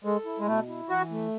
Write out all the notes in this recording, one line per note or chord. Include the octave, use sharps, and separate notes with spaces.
G#3 A4
E4
G#3
B2 A3
E4
E3 F#4
A3